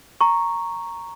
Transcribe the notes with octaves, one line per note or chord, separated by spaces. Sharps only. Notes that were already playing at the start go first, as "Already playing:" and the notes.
A#5 C#6